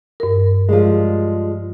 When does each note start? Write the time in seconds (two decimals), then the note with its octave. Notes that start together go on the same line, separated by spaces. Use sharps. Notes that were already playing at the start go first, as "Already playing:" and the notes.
0.20 G2 A#4
0.69 F3 G3 G#3